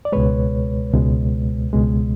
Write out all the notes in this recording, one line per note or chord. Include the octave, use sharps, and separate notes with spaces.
D5
C#2 B2 G#3 B4 C#5
C#2 B2 G#3
C#2 B2 G#3